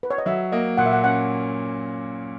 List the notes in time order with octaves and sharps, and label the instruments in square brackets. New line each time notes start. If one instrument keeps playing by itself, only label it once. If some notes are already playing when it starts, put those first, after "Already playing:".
[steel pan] B4
C#5
D#5
[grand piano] F#3 [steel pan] E5
[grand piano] A#3 [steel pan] D#5
[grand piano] A#2 [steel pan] F#5
[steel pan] E5
F#5
[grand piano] C#4 [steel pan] F#5